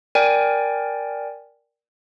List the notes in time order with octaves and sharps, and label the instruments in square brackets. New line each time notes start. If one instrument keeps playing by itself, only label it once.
[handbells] A#4 D5 G5 G#5